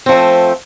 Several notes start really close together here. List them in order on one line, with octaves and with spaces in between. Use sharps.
C4 F3 A3